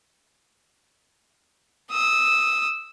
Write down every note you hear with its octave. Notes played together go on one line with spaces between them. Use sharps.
D#6 E6